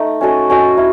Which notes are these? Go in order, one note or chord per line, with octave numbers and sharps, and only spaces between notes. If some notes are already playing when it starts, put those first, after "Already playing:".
Already playing: A3 D#4
C#4 F#4 A4 D#5
C#4 F#4 A4 D#5
E4